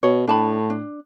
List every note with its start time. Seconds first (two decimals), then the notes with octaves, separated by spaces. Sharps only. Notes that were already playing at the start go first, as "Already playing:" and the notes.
0.03 B2 C#5
0.27 A2 D4 A5 B5
0.70 D4